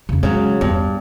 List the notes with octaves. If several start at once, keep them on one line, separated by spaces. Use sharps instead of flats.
F2 C#3
C#3 F#3 G#3
E2 G2 B3